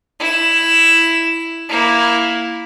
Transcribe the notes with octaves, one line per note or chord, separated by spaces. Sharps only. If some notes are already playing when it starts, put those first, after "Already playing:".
E4 E7
A#3 E4